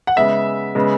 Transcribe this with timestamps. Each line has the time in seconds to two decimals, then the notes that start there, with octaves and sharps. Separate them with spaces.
0.07 F#5
0.16 C#3 G#3 B3 E5
0.75 C#3 G#3 B3